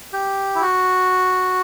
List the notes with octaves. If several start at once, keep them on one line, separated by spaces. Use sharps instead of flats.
G4
E4
F#4